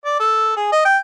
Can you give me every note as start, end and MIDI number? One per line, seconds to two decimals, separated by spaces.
0.05 0.19 74
0.20 0.55 69
0.57 0.70 68
0.72 0.82 75
0.85 0.97 79